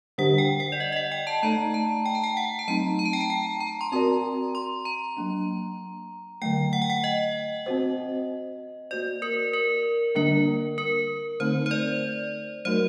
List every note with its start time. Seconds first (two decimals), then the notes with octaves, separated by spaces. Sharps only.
0.18 D3 G3 D4 G4 C5 F#5
0.38 G5
0.60 F#5
0.72 D5
0.80 D#5
0.92 D#5
0.96 F#5
1.12 G5
1.27 A5
1.43 A3 D#4 A4 D5 A#5
1.74 A5
2.06 G5
2.15 A5
2.24 G5
2.37 F#5
2.59 A5
2.68 F#3 A3 C4 D#4 A#5
2.99 A#5
3.05 A5
3.13 G5
3.21 A5
3.30 G5
3.60 A#5
3.81 C6
3.92 C4 F#4 A#4 D5 A#5
4.55 C6
4.85 A#5
5.17 F#3 A#3 D4
6.42 D3 F#3 A3 G5
6.73 F#5
6.82 G5
6.90 F#5
7.04 D#5
7.66 C4 F#4 C5
8.91 A#3 F#4 C5 D5
9.22 A#4
9.53 A#4
10.15 D3 G3 A#3 D4 A#4
10.78 A#4
11.40 D3 A3 C4 D#4 C5
11.66 C5
11.71 D5
12.65 F#3 A3 D#4 F#4 A#4 C5